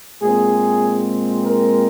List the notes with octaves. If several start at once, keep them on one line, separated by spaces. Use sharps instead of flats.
A#2 G#3 C4 G#4
A#4